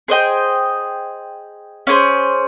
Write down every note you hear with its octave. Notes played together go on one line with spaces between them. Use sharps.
G#4 C5 D#5 G5
C#4 G#4 C5